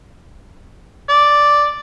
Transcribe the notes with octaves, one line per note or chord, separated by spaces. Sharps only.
D5